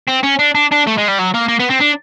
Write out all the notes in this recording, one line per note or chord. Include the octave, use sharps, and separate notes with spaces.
C4
C#4
D4
D4
D4
A3
G#3
G3
F#3
A#3
A#3
B3
C4
D4